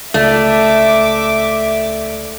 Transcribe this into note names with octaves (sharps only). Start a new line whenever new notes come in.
C#2 A3 D5 E5 D6